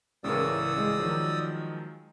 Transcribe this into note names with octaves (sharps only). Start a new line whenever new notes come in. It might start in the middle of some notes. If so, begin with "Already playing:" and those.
C#2 A2 C#3 E3 A#4 D5 D#6 E6
G#3
D#3 F3 F#3